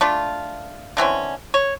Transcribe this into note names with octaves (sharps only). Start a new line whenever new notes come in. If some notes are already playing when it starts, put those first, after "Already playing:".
A3 D4 F4
D3 E3 C4 C#4
C#5